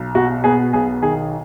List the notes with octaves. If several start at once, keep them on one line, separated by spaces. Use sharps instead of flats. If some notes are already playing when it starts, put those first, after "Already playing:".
Already playing: B1
B2 F#4
B3 G#4
B1 G#4
D#3 G#4